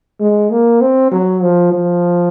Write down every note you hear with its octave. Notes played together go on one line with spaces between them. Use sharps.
G#3
A#3
C4
F#3
F3
F3